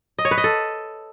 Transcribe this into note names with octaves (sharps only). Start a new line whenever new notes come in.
D#5
C#5
B4
D#5
A4